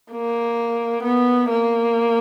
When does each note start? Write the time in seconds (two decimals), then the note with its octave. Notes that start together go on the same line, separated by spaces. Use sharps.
0.11 A#3
1.03 B3
1.50 A#3